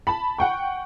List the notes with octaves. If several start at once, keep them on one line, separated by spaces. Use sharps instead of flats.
A5 B5
F#5 G5 C#6